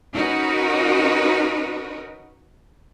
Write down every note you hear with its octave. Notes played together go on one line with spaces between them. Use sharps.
C#4 D#4 F#4 A#4 B4